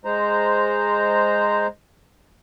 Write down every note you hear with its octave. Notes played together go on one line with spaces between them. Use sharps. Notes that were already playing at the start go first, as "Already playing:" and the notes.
G#3 C5 A#5